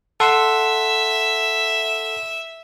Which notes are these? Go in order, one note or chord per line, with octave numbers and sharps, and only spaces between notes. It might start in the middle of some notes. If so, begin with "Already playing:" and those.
A4 E5 F#5 C6